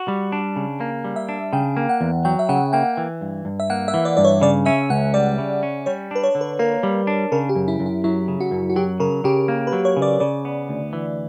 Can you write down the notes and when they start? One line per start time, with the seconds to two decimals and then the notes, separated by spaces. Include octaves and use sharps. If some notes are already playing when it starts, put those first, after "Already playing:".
Already playing: F#4
0.08 G3
0.32 D4
0.56 C#3
0.80 A#3
1.04 G3
1.16 E5
1.29 D4
1.53 C#3 G5
1.77 A#3
1.89 F#5
2.01 E2
2.25 F#3 G5
2.39 E5
2.49 C#3 F#5
2.73 A#3 G5
2.97 E3
3.21 G2
3.45 G2
3.60 E5
3.70 A#3 F#5
3.88 E5
3.94 E3
4.05 D5
4.17 G2 D5
4.25 C#5
4.41 C#3 D5
4.66 C#4 E5
4.90 C#2 F#5
5.14 G3 D5
5.38 C#3
5.63 C#4
5.86 G3 C#5
6.11 D4 B4
6.23 C#5
6.35 D3
6.41 B4
6.59 A#3 A#4
6.83 G3
7.07 D4
7.32 C#3 A#4
7.49 G4
7.56 F#2
7.68 E4
7.80 F#2
7.86 E4
8.04 F#3 E4
8.28 C#3
8.40 F#4
8.51 F#2
8.70 F#4
8.76 F#3 G4
9.00 C#3 A#4
9.24 C#3 G4
9.48 A#3
9.67 B4
9.73 F#3
9.85 C#5
9.97 C#3
10.02 D5
10.20 C#3 D5
10.45 B3
10.69 D2
10.93 E3